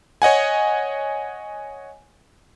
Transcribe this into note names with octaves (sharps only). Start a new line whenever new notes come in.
C#5 D#5 F#5 G#5